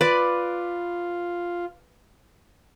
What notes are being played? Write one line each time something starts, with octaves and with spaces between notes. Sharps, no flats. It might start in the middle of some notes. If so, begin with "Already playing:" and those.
F4 B4 D5